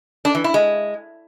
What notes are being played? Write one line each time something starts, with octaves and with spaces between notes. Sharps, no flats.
D4
E3
E4
G#3